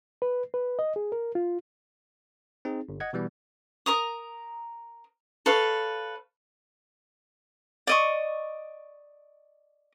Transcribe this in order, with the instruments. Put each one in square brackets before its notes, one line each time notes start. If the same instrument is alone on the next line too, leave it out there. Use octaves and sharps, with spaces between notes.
[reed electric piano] B4
B4
D#5
G#4
A#4
F4
[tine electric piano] C4 D#4 G#4
G1
D#5 F#5 G#6
B2 E3 G3 B3
[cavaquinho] A#4 A#5 D#6
A4 B4 C#5 F5
D5 D#5 C#6